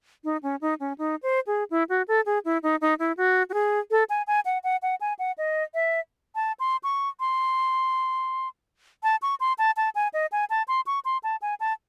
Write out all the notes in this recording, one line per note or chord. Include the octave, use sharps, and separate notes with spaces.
D#4
C#4
D#4
C#4
D#4
C5
G#4
E4
F#4
A4
G#4
E4
D#4
D#4
E4
F#4
F#4
G#4
A4
G#5
G#5
F#5
F#5
F#5
G#5
F#5
D#5
E5
A5
C6
C#6
C6
A5
C#6
C6
A5
A5
G#5
D#5
G#5
A5
C6
C#6
C6
A5
G#5
A5